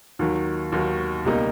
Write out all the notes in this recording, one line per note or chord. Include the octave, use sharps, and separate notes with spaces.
D#2 D#3 F#3
D#2 D#3 F#3
C#2 B2 G3 A#3 D#4